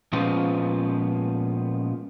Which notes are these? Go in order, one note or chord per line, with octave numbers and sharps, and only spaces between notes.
A#2 F3 G#3 B3 C#4 F4